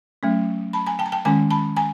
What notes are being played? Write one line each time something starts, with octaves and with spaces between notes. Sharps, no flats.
F#3 A3 C#4
A5 B5
G#5 A#5
G5 A5
A#5
G5 A5
D#3 G#3 C#4 G#5 A#5
A5 B5
G#5 A#5